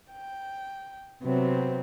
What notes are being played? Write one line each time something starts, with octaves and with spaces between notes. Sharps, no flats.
G5
C3 F#3 B3 C4